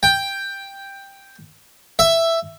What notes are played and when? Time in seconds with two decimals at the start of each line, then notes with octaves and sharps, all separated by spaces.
0.03 G5
1.99 E5